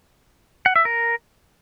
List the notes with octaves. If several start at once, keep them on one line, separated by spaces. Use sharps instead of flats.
F#5
E5
A#4